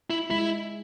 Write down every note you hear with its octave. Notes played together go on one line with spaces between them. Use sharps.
E4
G#3 E4